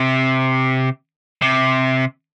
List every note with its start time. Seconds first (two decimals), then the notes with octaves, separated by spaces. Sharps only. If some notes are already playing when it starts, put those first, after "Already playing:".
Already playing: C3
1.42 C3